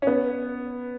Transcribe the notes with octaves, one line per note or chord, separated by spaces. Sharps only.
C#4
B3